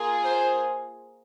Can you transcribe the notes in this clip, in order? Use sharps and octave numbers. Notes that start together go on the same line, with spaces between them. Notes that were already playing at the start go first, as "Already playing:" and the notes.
Already playing: A#3 F4 G#4
C5